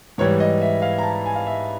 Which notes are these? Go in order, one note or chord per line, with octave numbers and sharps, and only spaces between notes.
G#2 E3 G3 C#5
D#5
E5
F5
A#5
A5
G#5
F5
E5